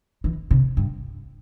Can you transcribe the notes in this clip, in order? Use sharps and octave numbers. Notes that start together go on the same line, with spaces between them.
E3
C3
G2